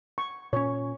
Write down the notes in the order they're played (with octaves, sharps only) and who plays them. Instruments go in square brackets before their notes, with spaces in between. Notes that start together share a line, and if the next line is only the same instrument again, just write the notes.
[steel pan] C#6
[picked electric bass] A#2 C#4 [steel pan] C#5